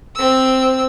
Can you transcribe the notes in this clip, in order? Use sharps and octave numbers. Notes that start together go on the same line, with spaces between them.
C4 E6